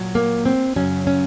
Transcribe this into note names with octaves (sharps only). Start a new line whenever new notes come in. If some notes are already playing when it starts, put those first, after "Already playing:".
Already playing: A#2 F#3
A#3
C4
F#2 C#3 F#3 C#4
C#4